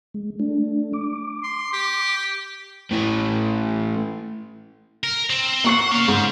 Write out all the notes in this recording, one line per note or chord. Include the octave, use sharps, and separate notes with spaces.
G#3
A3 D4
D6
C6
G4
A2 E3
A#4
C4
A#3 F#5 C#6 C7
C#4 F5
G#2